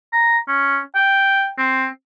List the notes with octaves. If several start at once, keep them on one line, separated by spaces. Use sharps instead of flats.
A#5
C#4
G5
C4